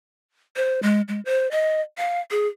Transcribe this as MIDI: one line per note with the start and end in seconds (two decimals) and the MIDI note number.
0.56 0.80 72
0.83 1.01 56
1.08 1.20 56
1.25 1.49 72
1.51 1.81 75
1.98 2.20 77
2.31 2.48 68